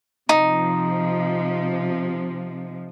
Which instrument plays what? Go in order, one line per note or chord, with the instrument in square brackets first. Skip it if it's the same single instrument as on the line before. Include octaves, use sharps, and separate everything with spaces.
[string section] C3 F3 [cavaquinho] D#4